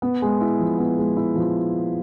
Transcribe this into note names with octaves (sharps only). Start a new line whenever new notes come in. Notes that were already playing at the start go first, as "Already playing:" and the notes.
B3
G#3
E4
F3
B3
G#3
E4
F3